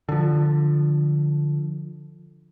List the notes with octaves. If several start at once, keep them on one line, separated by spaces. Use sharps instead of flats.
D3 F3